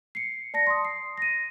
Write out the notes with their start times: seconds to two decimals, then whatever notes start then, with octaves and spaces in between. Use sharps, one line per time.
0.15 C7 C#7
0.54 D5 A5 A#6 C#7
0.67 C6 D#6
0.85 C7
1.17 A#6 D#7